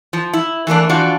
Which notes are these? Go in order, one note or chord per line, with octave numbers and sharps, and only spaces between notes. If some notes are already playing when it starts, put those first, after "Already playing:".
F3
E4
E3 A3 A#3 D4
E3 F3 D4 F4 F#4